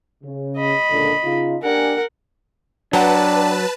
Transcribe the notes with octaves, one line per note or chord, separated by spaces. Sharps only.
C#3
D#5 B5
C#2 A#2 D3
C#3 D#4 F4
D4 G4 A#4 F#5 G#5
F#3 D4 F#4 B4 G5 A5 A#5